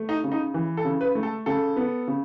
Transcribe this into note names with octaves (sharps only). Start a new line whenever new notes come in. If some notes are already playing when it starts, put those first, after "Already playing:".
Already playing: A3
D#4
C#3
D#4
E3
A4
C#3
B4
A3
A4
C#3 A4
B3
C#3